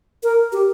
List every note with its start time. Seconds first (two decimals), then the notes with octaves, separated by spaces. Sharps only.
0.23 A#4
0.52 G4